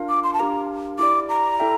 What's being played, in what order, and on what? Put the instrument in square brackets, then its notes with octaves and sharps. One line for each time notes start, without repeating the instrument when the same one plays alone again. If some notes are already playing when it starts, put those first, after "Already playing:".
Already playing: [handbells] D4 F4 A#4 F5
[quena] D6
C6
A5
[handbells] D4 G4 A#4 F5 [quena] A#5
[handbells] E4 G4 D5 [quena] D6
[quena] A#5
[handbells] E4 A4 E5 G5